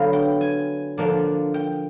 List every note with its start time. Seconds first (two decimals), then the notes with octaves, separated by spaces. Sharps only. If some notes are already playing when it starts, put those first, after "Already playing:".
Already playing: D3 F#3 B3 F5
0.13 G5
0.41 G#5
0.97 D3 F3 A#3 D4
1.54 G5